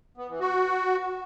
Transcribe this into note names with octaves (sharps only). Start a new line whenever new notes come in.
B3
E3
F#4